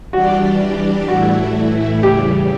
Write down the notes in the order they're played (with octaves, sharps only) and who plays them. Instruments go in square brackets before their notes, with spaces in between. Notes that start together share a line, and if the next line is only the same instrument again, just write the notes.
[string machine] E3 G3 D4 G4 D5 [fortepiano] F#4
[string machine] A2 E3 A3 E4 [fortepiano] F#4
[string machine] E2 C#3 G3 [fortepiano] G4